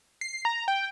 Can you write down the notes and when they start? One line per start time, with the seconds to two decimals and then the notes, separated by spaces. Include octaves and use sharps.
0.21 C7
0.45 A#5
0.68 G5